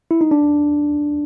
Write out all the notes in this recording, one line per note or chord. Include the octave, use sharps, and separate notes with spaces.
E4
D#4
D4